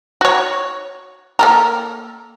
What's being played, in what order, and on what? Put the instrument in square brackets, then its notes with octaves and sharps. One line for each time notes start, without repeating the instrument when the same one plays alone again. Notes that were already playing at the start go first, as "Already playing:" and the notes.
[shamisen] F#4 C#5
A#3 A4 A#4